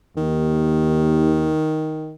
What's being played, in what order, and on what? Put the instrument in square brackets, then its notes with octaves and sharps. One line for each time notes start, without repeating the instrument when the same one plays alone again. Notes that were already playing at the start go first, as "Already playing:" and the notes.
[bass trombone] D#2 [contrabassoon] D#3